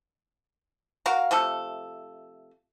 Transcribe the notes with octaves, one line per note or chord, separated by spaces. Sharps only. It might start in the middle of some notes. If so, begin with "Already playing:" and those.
F#4 A#4 F5
C3 F3 A3 A4